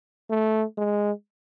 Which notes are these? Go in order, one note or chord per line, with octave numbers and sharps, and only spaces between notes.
A3
G#3